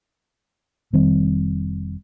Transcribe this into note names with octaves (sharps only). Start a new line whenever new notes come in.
F1 D#3 G3 C4